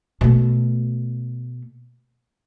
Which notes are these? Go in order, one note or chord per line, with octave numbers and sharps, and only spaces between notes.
B2 A3